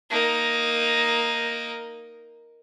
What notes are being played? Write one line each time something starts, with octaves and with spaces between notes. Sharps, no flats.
A#3 D#4